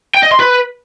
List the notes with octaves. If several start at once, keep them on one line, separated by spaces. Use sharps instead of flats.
G5
D#5
C6
B4